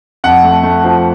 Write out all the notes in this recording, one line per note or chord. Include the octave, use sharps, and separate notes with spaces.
F2 F#5
A3
A3
F3